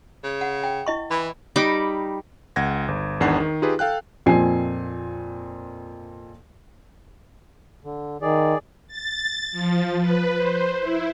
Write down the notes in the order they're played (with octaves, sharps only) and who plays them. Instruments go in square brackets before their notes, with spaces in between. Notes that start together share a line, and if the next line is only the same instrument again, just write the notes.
[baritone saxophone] C#3
[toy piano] F#5
G5
E4 D#5 C#6
[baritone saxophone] E3 [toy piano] B5
[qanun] G3 D#4 B5 D6
[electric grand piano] C#2 F#5 G#6 A#6
G1
G#1 E2 D#3 D4 F#5 C7
D#3
D#4 F4 G4 G#4 B4
A4 F5 G5 F#6
[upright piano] F2 A#2 C4 G#5 C7
[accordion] D3
[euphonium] D#3 [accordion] G#4 D5
[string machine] A6
F3
B4
C5
E4